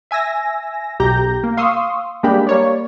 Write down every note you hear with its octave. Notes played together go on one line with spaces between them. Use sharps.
E5 G#5 E6 A#6
B1 G4 A#5 G6 A#6
A#3
F5 C6 C#6 D#6 E6
G3 G#3 A#3 D4 G4 B5
A#3 C#5 D5